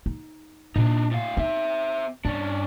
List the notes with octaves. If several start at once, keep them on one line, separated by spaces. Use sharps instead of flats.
D#4
A#2 D4 D#4
A2 F5
C4 D#4 E5
G2 C#4 D4